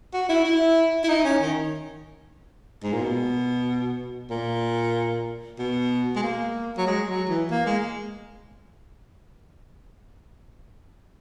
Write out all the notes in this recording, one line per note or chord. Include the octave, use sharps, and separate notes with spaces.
F#4
E4
E4
E4
D#4
C#4
D#3
G#2
A#2
B2
A#2
B2
G#3
A#3
F#3
G#3
F#3
E3
A#3
G#3